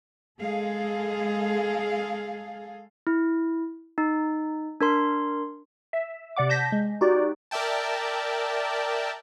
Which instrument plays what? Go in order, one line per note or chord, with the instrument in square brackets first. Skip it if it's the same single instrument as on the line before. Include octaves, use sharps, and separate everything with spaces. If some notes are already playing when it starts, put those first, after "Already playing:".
[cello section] G#3 G#4 A4 F5
[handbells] E4
D#4
D4 A#4 C6
[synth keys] E5
C3 D5 F#5 D6
A5 G6 A#6 B6
G#3
D#4 F#4 G4 D5
[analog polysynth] A#4 D5 E5 G5 A5